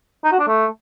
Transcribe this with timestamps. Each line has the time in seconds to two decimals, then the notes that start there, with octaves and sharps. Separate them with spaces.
0.24 D#4
0.32 F#4
0.40 D4
0.47 A3